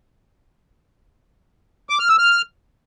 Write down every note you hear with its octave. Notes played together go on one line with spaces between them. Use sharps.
D6
F6
E6
F6